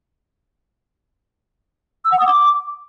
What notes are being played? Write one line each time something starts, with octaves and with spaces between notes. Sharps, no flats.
E6
F#5
D#6
D6